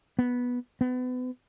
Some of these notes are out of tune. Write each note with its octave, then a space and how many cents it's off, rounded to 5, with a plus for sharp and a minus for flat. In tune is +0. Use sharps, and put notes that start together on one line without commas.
B3 -10
B3 +30